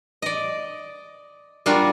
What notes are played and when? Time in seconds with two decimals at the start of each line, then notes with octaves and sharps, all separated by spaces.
0.22 D5 D#5
1.66 G3 A#3 D4 F4 F#4